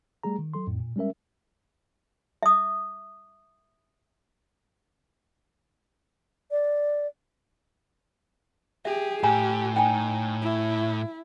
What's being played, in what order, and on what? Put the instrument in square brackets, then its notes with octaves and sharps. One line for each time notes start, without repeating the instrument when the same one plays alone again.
[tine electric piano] G3 A3 G#4 A#5
D#3
F#3 A4 C6
F2 A2
A#2
G3 G#3 C#4 A#4 E5
[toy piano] E5 D#6
[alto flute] D5
[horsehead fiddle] G4 G#4 [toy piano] E5
[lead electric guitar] A2 [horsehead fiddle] G4 [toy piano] G#5 A#5
[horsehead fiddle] D#4 [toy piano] G5 G#5
[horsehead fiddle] E4